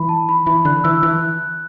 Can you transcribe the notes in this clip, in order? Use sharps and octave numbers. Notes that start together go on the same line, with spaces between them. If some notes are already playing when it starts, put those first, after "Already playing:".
Already playing: E3 B5
A5
B5
E3 B5
D3 F#6
E3 E6
E3 F#6